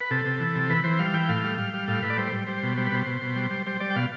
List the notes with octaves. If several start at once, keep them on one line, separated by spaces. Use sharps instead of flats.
B4
C3 A4
C3
E3
C3
E3 B4
E3 C5
G3 F5
E3 G5
A2 F5
G3
G3
G3
A2 F5
A2 B4
D5
G3 C5
G3
G3 C5
B2
G3 C5
B4
B2 C5
B2
B2
G3
G3
G3 C5
G3 D5
G5
B2 F5